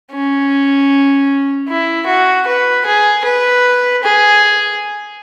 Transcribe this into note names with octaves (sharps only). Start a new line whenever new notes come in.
C#4
E4
F#4
B4
G#4
B4
G#4